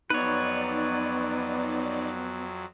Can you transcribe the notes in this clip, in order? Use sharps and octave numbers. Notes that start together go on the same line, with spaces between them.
F2 F#3 B3 D#4 B4 C#5 D5